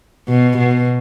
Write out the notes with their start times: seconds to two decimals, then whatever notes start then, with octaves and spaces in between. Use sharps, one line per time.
0.29 B2
0.58 B2